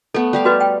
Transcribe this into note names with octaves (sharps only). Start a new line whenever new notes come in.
A3 B3 A4
G3 G4 F5
F#4 B4 D#5
G5